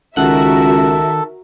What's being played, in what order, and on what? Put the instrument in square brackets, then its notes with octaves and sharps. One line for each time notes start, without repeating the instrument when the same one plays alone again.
[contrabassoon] C#2 [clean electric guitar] D#3 F#5 [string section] F#4 A#4 E5 [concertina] A4